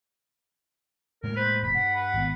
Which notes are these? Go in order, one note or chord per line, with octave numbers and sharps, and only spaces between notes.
A2 G#3 A#3 A#4
B4 C5
E1 B5
G2 F#5
B4
G#1 B3